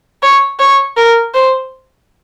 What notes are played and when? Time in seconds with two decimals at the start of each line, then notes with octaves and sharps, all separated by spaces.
0.23 C#5
0.60 C#5
0.97 A#4
1.34 C5